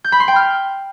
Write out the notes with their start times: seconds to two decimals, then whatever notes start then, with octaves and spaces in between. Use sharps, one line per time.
0.04 G6
0.12 B5
0.20 C6
0.28 G5
0.36 F6